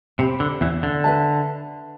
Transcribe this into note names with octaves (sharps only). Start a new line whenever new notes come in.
C3 G4 C5 G5 B5
D3
E2 E3
D3
B4 E5 A5